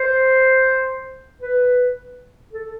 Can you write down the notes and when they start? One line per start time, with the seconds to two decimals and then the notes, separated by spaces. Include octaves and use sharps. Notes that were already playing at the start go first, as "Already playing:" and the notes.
Already playing: C5
1.41 B4
2.53 A4